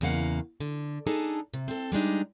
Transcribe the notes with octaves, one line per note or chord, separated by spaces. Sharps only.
E2 C#3 A#3 F5 F#5
D3
D4 D#4 G#4 A4 A5
C3
C4 A4
G3 G#3 D4 D#4